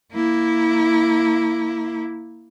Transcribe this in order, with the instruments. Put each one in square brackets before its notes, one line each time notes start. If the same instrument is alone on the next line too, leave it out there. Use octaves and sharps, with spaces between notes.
[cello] A#3 E4